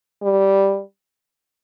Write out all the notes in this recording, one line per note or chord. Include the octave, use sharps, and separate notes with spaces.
G3